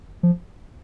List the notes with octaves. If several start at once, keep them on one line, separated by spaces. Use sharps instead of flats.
F3